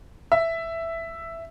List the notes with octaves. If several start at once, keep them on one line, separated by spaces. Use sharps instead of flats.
E5